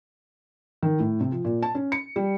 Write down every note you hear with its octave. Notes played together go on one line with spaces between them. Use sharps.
D#3
A2
C3
F3
A#2
A5
C#4
C#7
G3